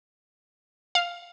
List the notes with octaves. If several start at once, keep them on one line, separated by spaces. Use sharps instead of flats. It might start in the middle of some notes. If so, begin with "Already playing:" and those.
F5